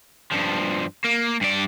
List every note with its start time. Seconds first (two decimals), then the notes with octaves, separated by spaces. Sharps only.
0.31 G2 F3
1.04 A#3
1.41 G2 D5